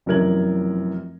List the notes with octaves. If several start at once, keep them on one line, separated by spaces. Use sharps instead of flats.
F1 F#2 E3 A#4 G#6 F#7